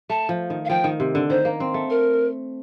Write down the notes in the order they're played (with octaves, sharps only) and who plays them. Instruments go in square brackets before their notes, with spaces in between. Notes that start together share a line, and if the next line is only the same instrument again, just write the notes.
[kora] A3 [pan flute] A5
[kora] F3
D#3
[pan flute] F5
[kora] F3 [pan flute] G5
[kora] D#3
C3
D3
[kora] D#3 [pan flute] C5
[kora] A#3
C4
A3
[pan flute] A#4